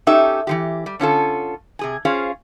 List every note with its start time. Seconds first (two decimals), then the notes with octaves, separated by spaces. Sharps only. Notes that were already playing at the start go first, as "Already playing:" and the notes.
0.07 C#4 D#4 G4 A4 E5
0.47 E3 F3 G4
0.86 G3
1.00 D3 C#4 F4 A4
1.79 C3 G#4 G#5
2.05 C#4 F4 G#4 C5 F5